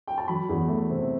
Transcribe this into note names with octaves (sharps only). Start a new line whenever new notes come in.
G5
A5
F#3 B5
E2
A3
C3